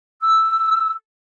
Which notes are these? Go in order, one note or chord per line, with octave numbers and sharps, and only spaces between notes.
E6